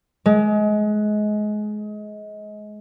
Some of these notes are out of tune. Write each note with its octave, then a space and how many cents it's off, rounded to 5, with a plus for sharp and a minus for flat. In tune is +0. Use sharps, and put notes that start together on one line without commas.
G#3 +25